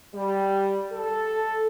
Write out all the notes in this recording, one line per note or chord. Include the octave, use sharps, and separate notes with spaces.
G3
A4